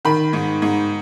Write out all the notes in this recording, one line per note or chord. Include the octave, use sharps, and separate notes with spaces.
D#3 B5
G#2
G#2